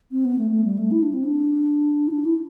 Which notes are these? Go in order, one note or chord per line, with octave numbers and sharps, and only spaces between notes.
C4
B3
A3
A3
G3
A3
E4
D4
C4
D4
E4
D4
E4